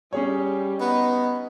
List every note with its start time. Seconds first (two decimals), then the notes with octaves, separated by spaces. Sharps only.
0.13 G3 C#4 G#4 C#5
0.81 B3 D#4